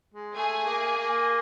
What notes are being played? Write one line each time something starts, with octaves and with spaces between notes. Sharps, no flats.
G#3
A3 G#4 G#5
A#3
A#3